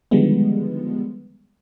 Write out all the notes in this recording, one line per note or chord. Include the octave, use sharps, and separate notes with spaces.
D3 D#3 F3 G3 G#3 B3